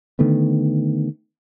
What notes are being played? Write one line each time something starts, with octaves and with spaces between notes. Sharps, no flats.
D3 D#3 A3 B3